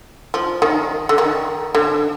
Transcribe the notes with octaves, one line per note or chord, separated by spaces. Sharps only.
F3
D#3
D3
D#3
D3